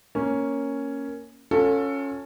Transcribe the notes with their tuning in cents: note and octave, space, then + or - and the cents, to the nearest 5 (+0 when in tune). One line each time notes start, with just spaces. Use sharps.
A#3 +0 C#4 +0
C#4 +0 F4 +35 A4 +15